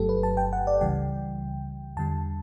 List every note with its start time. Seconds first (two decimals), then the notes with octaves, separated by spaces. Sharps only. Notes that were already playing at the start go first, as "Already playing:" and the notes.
Already playing: G1 G2 F#3 A3 G4 A4
0.09 B4
0.23 A5
0.37 G5
0.53 F#5
0.67 D5
0.81 C#2 C#3 E3 G3 G5
1.97 E2 D3 G3 A5